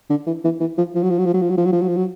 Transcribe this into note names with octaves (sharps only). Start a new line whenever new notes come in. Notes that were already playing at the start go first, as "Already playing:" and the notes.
D3
E3
E3
E3
F3
F3
F#3
F3
F#3
F3
F#3
F3
F#3
F3
F#3
F3
F#3
F3
F#3